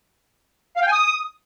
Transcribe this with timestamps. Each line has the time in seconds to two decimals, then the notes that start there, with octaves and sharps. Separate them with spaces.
0.76 F5
0.82 G5
0.87 G#5
0.92 D#6